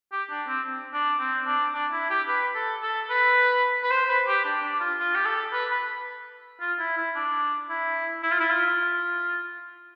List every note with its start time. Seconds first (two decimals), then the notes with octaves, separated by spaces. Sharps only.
0.12 G4
0.30 D4
0.48 C4
0.93 D4
1.20 C4
1.47 D4
1.74 D4
1.92 E4
2.10 G4
2.28 B4
2.55 A4
2.82 A4
3.10 B4
3.83 B4
3.91 C5
4.09 B4
4.27 G4
4.44 D4
4.63 D4
4.80 F4
4.99 F4
5.15 G4
5.25 A4
5.52 B4
5.71 B4
6.61 F4
6.79 E4
6.97 E4
7.15 D4
7.69 E4
8.23 E4
8.32 F4
8.40 E4
8.50 F4